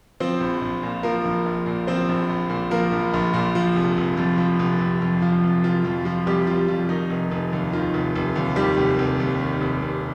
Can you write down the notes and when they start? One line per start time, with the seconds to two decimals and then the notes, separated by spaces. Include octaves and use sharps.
0.20 F3 C4 C5
0.40 A#1
0.62 A#1
0.83 A#2
1.03 F3 A#3 A#4
1.25 A#1
1.46 A#1
1.66 A#2
1.87 F3 C4 C5
2.09 A#1
2.29 A#1
2.50 A#2
2.71 F3 A#3 A#4
2.92 A#1
3.14 A#1
3.34 A#2
3.55 F3
3.75 F1
3.97 F1
4.17 F2
4.38 F3
4.59 F1
4.81 F1
5.02 F2
5.22 F3 F4
5.43 F1
5.63 F1 F4
5.84 F2
6.05 F3 F4
6.26 F1 G3 G4
6.47 F1 F4
6.68 F2 F4
6.89 D#3 D#4
7.10 F1
7.31 F1
7.53 D#2
7.73 D#3 F4
7.94 F1
8.16 F1
8.36 D#2
8.56 D#3 G3 G4
8.77 F1
8.99 F1
9.20 D#2
9.40 D#3
9.61 F1
9.82 F1